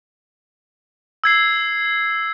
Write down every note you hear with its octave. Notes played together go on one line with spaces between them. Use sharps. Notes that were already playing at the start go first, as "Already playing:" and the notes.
E6 G#6 C7